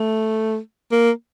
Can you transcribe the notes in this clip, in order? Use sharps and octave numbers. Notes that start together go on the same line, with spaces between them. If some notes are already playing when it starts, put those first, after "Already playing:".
Already playing: A3
A#3